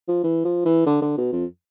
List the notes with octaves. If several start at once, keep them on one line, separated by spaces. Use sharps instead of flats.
F3
E3
F3
E3
D3
D3
B2
F2